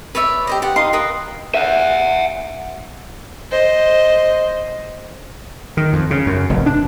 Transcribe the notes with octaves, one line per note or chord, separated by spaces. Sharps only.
B4 C#5 D5 E5
G4 C5 D#5
G4 D5 F#5
D#4 D#5 F5 C6
A#4 B4 D#5 D#6
E5 F#5
C5 D#5
D#3
F2
C#3
F#2
F1
D4